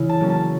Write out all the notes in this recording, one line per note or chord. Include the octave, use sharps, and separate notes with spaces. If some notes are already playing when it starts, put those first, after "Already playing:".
Already playing: C#3 E3 E4
A5
F#3 A#3 C#4
A5